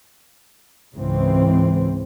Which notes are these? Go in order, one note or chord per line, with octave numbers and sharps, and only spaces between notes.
C#2 G#2 C#3 E3 C4